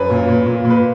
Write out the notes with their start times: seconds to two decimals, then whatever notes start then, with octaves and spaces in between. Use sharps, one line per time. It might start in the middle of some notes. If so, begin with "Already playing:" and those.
Already playing: F#2 B4
0.10 A#2
0.29 A#2
0.46 A#2
0.65 A#2
0.70 B4